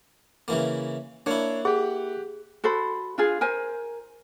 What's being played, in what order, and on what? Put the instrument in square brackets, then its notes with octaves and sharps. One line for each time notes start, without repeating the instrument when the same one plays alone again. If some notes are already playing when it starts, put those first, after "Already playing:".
[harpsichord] C#3 E3 A#3
[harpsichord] A#3 E4 [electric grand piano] D4 C#5
[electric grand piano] G4 F#5 [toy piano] G#4
[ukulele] F#4 A4 C5 B5
D4 F4 G#4
A#4 C5 G#5